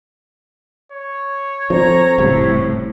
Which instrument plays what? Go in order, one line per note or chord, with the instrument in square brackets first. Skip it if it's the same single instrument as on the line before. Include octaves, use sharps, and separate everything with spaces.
[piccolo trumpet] C#5
[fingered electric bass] F3 [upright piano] C4 A4 [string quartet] A#5
[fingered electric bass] F1 C#3 G3 [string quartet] A2